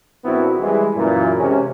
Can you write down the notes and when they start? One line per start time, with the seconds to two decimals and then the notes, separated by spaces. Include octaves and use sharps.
0.25 A#1 B3 C4 D4 E4 F#4
0.59 E3 G3 G#3
0.95 F#2 A#2 E3
1.38 C3 G#3 C#4